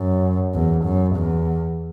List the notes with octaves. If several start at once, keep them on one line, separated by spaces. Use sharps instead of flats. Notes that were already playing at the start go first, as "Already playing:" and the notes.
Already playing: F#2
E2
F#2
E2